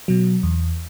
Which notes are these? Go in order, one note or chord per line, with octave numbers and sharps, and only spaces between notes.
B2 F#3
E2